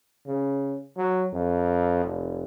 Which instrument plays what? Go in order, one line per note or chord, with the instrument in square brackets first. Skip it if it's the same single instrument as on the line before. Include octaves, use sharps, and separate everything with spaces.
[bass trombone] C#3
F#3
F2
F1